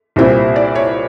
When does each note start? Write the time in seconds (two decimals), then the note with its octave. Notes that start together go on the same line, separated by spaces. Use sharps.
0.16 C2 A#2 G3 C4 E4
0.56 D5
0.75 C#5